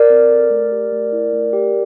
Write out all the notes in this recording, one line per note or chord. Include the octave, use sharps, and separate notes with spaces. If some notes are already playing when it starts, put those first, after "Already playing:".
Already playing: A#4 D5
C4
A4
A3
G4
A3
E4
A3
G4